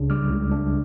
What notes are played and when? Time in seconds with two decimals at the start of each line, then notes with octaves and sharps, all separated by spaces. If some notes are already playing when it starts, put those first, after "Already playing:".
Already playing: C#2 C#3 D4
0.10 G3 D6 F6
0.31 C#2
0.51 D4